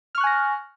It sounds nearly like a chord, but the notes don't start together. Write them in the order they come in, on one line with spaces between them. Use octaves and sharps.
F6 C#6 F#6 G#5 A#6